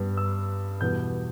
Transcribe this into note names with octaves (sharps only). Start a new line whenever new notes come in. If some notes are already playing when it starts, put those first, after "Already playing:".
Already playing: G2 G3 B3
E6
E2 B2 G3 B3 G6